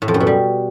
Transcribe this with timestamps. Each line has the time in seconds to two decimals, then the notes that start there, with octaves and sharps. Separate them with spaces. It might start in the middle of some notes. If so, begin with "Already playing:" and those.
0.02 A2
0.08 F2
0.14 F#2
0.20 B2
0.27 G3